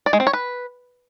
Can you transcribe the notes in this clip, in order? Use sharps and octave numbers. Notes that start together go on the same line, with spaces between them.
D5
G#3
C4
C#5
B4